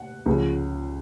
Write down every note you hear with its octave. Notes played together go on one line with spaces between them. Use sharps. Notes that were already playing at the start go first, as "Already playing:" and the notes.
Already playing: F#5
C#2 C#3 F3